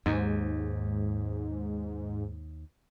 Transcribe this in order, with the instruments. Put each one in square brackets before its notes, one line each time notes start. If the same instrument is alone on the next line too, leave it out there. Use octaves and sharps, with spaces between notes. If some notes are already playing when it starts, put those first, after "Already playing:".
[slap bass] D#2 [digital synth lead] G#2